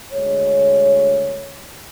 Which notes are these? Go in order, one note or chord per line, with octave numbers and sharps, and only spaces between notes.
D2 G#3 C#5